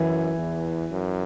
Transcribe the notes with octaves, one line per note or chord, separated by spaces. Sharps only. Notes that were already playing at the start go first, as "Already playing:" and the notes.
Already playing: F#2 E3
E2
F#2